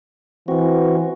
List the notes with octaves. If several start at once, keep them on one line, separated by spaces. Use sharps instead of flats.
E3 C4 F#4